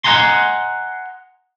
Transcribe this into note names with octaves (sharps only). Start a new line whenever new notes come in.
D#5 F#5 G#5 A#5 C6